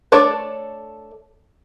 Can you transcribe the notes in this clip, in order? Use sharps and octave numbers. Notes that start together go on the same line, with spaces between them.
A3 D4 A4 C#5 D5